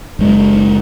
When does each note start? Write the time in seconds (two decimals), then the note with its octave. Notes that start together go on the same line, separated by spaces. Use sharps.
0.19 F#1 G#3